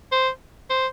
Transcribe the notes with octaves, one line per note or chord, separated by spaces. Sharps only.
C5
C5